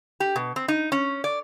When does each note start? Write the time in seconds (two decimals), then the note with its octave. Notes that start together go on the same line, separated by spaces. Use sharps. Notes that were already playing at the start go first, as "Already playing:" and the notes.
0.20 G4
0.36 B2
0.56 C4
0.68 D#4
0.92 C#4
1.24 D5